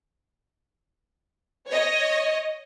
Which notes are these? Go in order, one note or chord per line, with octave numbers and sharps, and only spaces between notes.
C#5 D#5